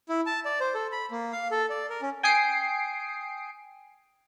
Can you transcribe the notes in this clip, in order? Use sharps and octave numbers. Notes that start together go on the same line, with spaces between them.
E4
A5
D5
C5
A4
B5
A#3
F5
A4
D5
A#4
C#4
G5 G#5 D#6 C7 D7